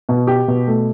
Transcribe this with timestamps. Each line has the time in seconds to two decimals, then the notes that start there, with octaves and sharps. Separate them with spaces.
0.09 B2
0.27 G4
0.48 B2
0.67 A3